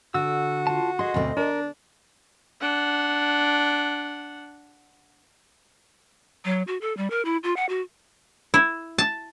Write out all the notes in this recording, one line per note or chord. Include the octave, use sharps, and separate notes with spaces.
D3 F#4 E6
F4 A5
G#4 D#5 C6
D2 B2 C4
D4 A#4
D4 F#5
F#3
F#4
A4
G3
A#4
E4
F4
F#5
F#4
E4
A5